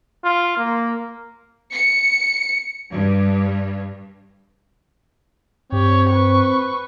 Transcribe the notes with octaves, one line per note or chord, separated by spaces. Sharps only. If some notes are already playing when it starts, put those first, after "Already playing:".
F4
A#3
C#7
G2
G2 C4 G4 C#5
B4 C#6